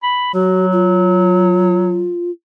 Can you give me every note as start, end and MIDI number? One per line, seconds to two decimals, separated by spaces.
0.03 0.29 83
0.34 2.12 54
0.34 0.66 66
0.72 2.30 65